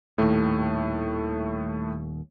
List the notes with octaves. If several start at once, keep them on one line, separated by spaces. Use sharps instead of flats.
D#1 D#2 A2 A3